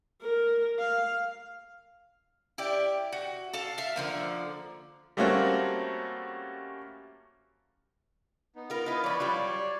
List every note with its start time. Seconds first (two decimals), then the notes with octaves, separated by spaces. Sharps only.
0.22 A#4
0.79 F5
2.58 E4 G4 D5
3.13 F#4
3.53 A4 F5 A5
3.78 E5 F5
3.96 D3 F3 A#3
5.17 G3 A3 A#3 C4 C#4 F#4
8.56 B3 D#4
8.70 F4 A#4
8.86 B3 E4 F4 B4 D#5
9.04 F3 B3 B4 C#5 D5
9.20 F#3 G3 F4